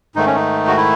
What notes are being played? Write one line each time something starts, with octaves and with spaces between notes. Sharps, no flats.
G#2 D#3 A3 D#4
C#4
D#4
F#4
E4